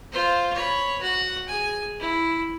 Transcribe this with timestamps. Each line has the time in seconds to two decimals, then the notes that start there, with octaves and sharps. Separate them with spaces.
0.12 F4 C5
0.54 C#5 B5
1.01 F#4 F#5
1.48 G#4 G#5
2.00 E4